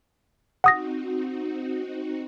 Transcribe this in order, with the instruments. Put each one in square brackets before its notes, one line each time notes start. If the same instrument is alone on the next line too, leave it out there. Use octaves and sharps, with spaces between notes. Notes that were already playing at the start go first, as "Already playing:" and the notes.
[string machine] C4 D#4 F#4 [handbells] F#5 D#6 A#6